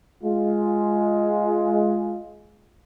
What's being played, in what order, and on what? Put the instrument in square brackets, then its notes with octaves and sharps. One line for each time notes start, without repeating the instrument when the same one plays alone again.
[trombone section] G#3 F4